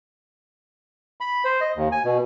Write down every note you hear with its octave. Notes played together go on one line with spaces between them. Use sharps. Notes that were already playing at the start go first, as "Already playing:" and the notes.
B5
C5
D#5
D#2
G#5
B2